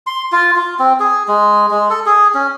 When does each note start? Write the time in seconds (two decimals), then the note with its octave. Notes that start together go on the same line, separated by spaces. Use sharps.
0.07 C6
0.32 F4
0.56 F4
0.79 C4
1.00 G#4
1.28 G#3
1.71 G#3
1.90 A4
2.06 G#4
2.34 C#4